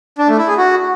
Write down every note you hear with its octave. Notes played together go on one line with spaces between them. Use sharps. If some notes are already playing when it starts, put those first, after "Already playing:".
D4
A3
E4
G#4
F#4